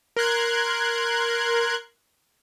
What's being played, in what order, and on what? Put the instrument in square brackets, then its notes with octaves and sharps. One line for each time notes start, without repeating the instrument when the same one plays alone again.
[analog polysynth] A#4 C6 F#6 G#6